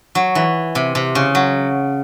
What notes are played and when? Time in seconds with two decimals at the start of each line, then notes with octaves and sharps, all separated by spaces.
0.15 F#3
0.35 E3
0.75 C3
0.95 C3
1.15 C#3
1.35 F#3